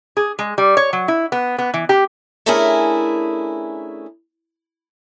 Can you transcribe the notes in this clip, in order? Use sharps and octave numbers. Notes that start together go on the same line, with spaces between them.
G#4
G#3
G3
C#5
F#3
E4
B3
B3
E3
G4
A3 C#4 D4 E4 G#4 A#4